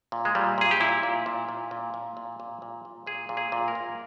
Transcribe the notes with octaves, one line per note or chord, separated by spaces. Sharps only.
A#2
G#3
A#2 G3
A#2 G#4
G4
A#2 E4
A#2
A#2
A#2
A#2
A#2
A#2
A#2
A#2
A#2
A#2 G#4
A#2
G#4
A#2
A#4
A#2